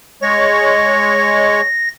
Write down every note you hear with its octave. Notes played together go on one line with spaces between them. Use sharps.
G#3 C#5 A#6